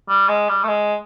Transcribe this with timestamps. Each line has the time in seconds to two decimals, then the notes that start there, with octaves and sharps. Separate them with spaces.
0.09 G3
0.29 G#3
0.49 G3
0.63 A3
0.68 G#3